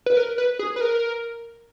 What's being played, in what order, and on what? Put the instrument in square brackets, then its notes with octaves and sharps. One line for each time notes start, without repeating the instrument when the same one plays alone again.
[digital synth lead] B4
A#4
B4
G#4
B4
A#4